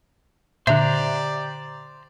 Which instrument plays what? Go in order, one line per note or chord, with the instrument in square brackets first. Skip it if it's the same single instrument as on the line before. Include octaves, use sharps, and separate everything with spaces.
[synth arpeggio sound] A#2 D3 [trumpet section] G4 D5 [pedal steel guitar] C5 A#5 F#6 [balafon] E5